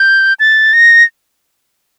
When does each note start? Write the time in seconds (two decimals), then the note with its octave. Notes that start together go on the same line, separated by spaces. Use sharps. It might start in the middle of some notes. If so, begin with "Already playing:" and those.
Already playing: G6
0.40 A6
0.73 A#6